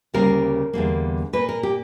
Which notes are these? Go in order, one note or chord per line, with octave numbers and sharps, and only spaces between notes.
D2 C#3 G3 A#3 A#4
E2 D3 G3 A#3
A#2 A#3 B4
A#4
G4